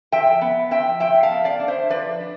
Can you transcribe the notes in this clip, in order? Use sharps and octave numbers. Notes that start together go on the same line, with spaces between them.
F3 E5 G5
B3
F3 E5 G5
F3 E5 G5
F5 A5
B3
D5 F5
D4
C5 E5
F3 B4 D5
D4